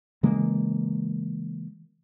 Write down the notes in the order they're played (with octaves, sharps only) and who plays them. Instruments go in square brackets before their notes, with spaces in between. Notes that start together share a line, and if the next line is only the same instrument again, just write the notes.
[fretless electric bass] C#3 E3 G#3 A#3